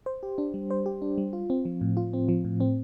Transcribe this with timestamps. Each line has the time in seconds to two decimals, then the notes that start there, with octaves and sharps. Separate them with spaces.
0.06 C5
0.23 G4
0.38 D4
0.54 G3
0.71 C5
0.86 G4
1.02 D4
1.18 G3
1.33 F4
1.50 C4
1.65 F3
1.81 A2
1.97 F4
2.13 C4
2.29 F3
2.44 A2
2.60 C4